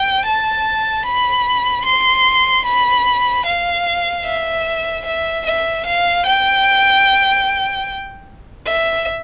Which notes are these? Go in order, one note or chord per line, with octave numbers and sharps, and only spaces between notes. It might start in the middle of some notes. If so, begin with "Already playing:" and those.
Already playing: G5
A5
B5
C6
B5
F5
E5
E5
E5
F5
G5
E5